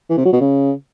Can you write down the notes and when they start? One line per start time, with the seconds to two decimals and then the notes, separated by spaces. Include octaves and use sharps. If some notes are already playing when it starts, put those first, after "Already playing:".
0.09 E3
0.17 C3
0.25 F#3
0.33 B2
0.41 C#3